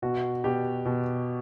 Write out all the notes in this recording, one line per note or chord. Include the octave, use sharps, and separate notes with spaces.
B2 F#4
B2 G4
B2